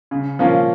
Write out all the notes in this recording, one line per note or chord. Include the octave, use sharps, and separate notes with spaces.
C#3
F3 A#3 C#4 F4